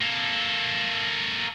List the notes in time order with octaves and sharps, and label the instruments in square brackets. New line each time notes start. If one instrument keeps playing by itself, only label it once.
[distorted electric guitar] A#3 A4